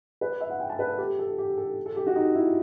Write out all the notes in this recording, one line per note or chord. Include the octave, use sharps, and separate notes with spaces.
B4
E5
F#5
G5
A5
B4
A4
G4
A4
G4
A4
A4
G4
F#4
D#4
E4